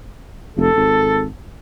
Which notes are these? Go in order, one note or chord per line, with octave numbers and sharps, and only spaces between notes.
F1 A4
G#1